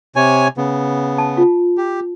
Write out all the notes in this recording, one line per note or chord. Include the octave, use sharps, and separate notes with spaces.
C3 C#5 G#5
C#3 B3
A5
F4
G4